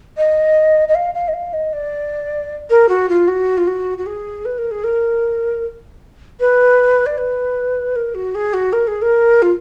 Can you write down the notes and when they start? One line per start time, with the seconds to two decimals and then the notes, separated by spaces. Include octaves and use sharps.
0.17 D#5
0.88 D#5
0.95 F5
1.14 F5
1.28 D#5
1.33 F5
1.53 D#5
1.73 D5
2.70 A#4
2.89 F#4
3.09 F4
3.28 F#4
3.58 F4
3.67 F#4
3.98 F#4
4.06 G#4
4.45 B4
4.58 A#4
4.71 G#4
4.84 A#4
6.40 B4
7.06 D5
7.18 B4
7.96 A#4
8.14 F#4
8.35 G#4
8.53 F#4
8.73 A#4
8.87 G#4
9.02 A#4
9.42 F4